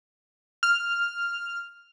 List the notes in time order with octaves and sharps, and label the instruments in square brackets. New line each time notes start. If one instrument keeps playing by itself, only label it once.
[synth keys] F6